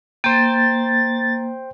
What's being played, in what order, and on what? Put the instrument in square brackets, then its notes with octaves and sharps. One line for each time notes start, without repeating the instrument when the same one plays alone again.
[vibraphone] A#3 [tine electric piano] C5 G5 [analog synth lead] A6